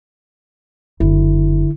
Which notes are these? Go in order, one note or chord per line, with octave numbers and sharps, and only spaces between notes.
F#1 D3 E4